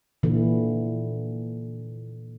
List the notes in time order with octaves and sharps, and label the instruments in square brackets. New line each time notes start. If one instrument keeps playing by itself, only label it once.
[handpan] A#2 D3 E3